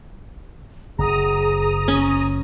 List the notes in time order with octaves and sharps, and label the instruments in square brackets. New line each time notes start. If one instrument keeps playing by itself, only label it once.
[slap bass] F#1 [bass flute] G#4 [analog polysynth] A#5 D#6
[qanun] C#4